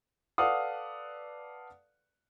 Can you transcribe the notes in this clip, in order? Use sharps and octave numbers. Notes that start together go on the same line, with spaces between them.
A4 B4 D5 F5 F#5 D#6